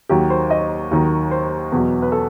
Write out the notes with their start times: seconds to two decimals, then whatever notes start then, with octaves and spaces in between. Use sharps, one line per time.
0.09 D#2 D#3 F#3 G4
0.30 C5
0.50 D#5
0.91 D#2 D#3 F#3
1.31 C5
1.72 E2 B2 F#3 B4
2.02 B4
2.12 A4